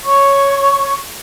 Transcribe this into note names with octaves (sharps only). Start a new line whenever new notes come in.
C#5 C#6